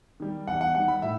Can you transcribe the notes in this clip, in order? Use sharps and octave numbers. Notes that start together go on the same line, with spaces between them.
D#3 G3
E2 F#5
F#5
D#3 G3 F#5
B5
A2 E5